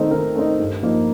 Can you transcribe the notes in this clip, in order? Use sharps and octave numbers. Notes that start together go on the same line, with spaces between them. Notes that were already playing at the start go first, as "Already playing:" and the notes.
Already playing: D#3 A3 C4 D#4
D#3 A#4
A3 C4 D#4
G2
F3 A#3 D#4